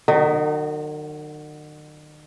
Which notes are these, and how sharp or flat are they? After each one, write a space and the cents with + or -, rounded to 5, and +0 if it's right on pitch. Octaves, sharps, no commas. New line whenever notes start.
D#3 -45 F#3 +0 D#5 +0